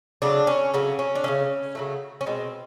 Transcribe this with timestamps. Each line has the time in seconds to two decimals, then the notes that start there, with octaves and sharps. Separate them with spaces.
0.22 C#3 F#3 A3 D4
0.47 C#4
0.74 C#3 F#3 A3 C#4
0.99 C#4
1.15 D4
1.24 C#3 F#3 A3 C#4
1.75 C#3 F#3 A3
2.21 C#4
2.26 B2 G#3 C4